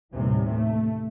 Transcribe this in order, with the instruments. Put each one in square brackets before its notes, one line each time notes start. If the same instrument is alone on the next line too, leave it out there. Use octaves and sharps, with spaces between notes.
[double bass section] D#2 A2 C3 E3 G3
A3